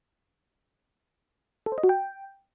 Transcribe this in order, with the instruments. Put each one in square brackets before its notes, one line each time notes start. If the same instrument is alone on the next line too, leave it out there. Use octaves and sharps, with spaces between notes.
[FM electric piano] A4
C5
D#5
F#4
G5